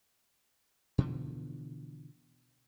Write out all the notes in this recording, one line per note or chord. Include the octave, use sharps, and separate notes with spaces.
B2 D3 E3 F3